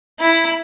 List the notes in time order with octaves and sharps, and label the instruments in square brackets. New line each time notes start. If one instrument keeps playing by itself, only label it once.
[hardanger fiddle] E4